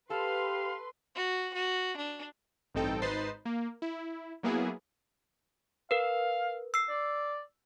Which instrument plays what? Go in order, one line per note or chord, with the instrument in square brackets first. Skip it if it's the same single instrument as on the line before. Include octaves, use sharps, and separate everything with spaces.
[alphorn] G4 [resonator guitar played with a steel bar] A4 [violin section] B4 C6 [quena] F5
[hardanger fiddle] F#4
F#4
D4
[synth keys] A1 G2 C4 D#4 A4 G5
G#1 D#4 B4 C5 A6 C7
A#3
E4
F#3 A#3 B3 E4 G#4
[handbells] A#4 B4 [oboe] F5
[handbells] E6 C7
[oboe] D5